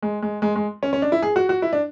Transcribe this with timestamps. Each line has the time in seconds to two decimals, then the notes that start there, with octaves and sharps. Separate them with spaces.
0.02 G#3
0.22 G#3
0.42 G#3
0.56 G#3
0.83 C#4
0.93 C#4
1.02 D4
1.12 E4
1.22 G#4
1.36 F#4
1.49 F#4
1.62 E4
1.73 D4